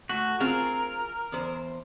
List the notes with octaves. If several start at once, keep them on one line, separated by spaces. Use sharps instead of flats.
A3 F#4
C4 F4 G#4 A#4
E2 C5